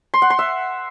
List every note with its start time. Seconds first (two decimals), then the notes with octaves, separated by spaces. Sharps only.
0.14 C6
0.22 F#5
0.30 C6
0.39 E5